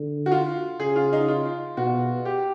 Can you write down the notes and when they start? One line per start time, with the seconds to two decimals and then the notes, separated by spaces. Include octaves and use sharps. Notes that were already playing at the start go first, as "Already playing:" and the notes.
Already playing: D3
0.26 F#4
0.32 F4
0.79 C#3 G#4
0.96 F4
1.13 D#4
1.28 F4
1.77 B2 F#4
2.25 G4